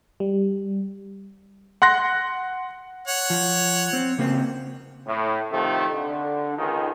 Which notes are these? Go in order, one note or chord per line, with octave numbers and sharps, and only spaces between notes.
G3
F#5 C6 F#6 A#6
C#5 F#5
F3
C4
C#3 A#3 C4
A2
C3 D#3 F3 A3
D3
C#2 D#3